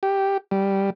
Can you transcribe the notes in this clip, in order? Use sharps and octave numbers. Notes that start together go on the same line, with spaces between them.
G4
G3